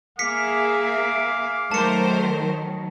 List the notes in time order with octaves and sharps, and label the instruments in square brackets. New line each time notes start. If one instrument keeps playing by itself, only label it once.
[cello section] A#3 G#4 E5 [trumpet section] F5 D6 [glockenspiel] B6 C#7
[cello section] D#3 F#3 [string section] A3 A#4 C5 [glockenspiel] A5 C#7